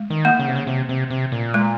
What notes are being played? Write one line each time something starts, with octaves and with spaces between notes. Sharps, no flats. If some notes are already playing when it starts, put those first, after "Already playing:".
Already playing: G#3
D#3
A#3
C#3
C3
C#3
C3
C3
C3
A#2
G#3